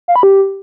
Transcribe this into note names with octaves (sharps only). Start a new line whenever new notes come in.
F5
B5
G4